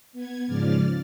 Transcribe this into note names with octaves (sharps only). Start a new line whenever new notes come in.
B3 G#6
G#2 C#3 F3 D5 F6 A6